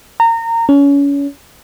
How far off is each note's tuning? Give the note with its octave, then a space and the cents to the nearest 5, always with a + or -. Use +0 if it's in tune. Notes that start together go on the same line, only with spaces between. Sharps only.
A#5 -25
C#4 +30